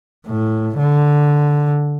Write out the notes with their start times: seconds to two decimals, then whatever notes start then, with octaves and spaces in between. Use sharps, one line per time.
0.27 A2
0.78 D3